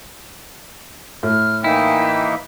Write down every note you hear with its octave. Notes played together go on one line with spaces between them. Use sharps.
A2 F6
E3 A#3 D#4 E4 G5 G#5